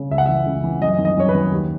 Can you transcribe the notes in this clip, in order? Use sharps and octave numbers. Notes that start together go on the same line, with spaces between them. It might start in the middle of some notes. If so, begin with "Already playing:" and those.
Already playing: C#3
C#2 E5
F#5
E3 E5
C#2
E3
F#2 D#5
D#3
D#5
F#2 C#5
B4
D#3
D#2